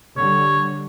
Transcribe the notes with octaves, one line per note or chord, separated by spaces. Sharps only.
D3 G3 C#5